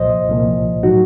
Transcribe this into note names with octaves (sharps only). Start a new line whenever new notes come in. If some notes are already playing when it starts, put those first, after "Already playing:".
Already playing: C2 A#2 F3 C5 D#5
C2 A#2 F3
A2 F#3 D#4 F#4